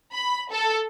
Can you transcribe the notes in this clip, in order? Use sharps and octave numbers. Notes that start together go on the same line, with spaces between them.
B5
A4